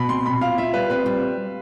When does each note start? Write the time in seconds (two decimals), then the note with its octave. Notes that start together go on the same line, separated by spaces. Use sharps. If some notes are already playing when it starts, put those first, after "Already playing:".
Already playing: B2 B5
0.09 C4 C6
0.26 C4 B5
0.41 F4 F5
0.58 F4 E5
0.74 G3 B4
0.90 C4 B4
1.06 G3